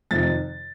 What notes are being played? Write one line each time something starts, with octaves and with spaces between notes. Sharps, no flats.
F2 C3 D#3 A6